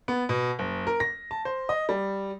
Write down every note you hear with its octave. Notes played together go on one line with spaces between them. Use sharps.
B3
B2
F#1
A#4
A#6
A5
C5
D#5
G3